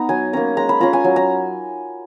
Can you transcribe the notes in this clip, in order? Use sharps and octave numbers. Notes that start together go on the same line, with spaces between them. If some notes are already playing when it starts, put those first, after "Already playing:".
Already playing: B3 D#4 A#5
F#3 G#5
A#3 C#4 A#5
G#3 A#5
B5
C#4 F4 A#5
G#5
F#3
A#5